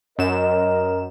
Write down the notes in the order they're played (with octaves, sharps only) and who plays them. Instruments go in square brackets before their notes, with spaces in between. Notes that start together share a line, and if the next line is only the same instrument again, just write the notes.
[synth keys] F#2 E7 [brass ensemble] A#4 D#5